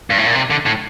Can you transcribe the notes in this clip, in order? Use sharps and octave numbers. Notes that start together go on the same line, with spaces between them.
G2
A2
A#2
C3
D3
A2